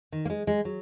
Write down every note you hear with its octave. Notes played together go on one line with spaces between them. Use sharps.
D#3
A#3
G#3
G#3
F#3